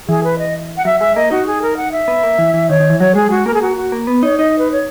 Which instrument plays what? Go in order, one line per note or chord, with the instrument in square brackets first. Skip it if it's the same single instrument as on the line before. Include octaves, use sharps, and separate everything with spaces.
[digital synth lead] E3 [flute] G#4
[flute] B4
D#5
F#5
[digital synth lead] F#3 [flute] E5
[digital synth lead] G#3 [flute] E5
[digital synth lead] A#3 [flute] D#5
[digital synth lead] D#4 [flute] F#4
[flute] G#4
A#4
F#5
E5
[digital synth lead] B3
A#3
E3
E3
[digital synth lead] D#3 [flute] C#5
[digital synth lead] D#3
E3
[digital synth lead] F#3 [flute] C#5
[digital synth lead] G#3 [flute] G#4
[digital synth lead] G#3 [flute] F#4
[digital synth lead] A#3 [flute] A#4
[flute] G#4
F#4
F#4
[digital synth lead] A#3
B3
[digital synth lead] D#4 [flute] C#5
[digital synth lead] D#4 [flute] D#5
[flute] B4
C#5